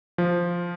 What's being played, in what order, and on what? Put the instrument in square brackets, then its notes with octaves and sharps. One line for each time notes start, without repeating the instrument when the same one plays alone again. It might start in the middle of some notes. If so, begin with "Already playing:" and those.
[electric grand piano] F3